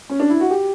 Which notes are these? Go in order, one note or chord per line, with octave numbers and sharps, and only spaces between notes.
C#4
D4
E4
F#4
G4